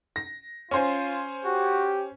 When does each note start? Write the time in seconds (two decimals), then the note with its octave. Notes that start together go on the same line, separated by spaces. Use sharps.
0.16 A#6
0.71 C#4 F4 C5 G#5
1.45 F#4 G4